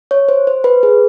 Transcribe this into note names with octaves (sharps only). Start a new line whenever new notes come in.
C#5
C5
C5
B4
G#4